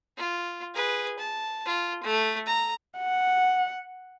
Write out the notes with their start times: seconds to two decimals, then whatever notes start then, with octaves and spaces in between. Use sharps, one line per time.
0.18 F4
0.75 G#4 B4
1.19 A5
1.66 F4
2.03 A3
2.46 A#5
2.98 F#5